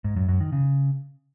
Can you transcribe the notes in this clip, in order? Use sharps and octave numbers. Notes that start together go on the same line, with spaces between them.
G#2
F#2
F#2
D#3
C#3